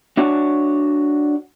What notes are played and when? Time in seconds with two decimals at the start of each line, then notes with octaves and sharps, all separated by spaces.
0.17 D4 F#4 C#5